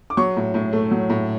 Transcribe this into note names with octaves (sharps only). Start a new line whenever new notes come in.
D6
F#3 C#6
A2
A2
A3
F#3
A2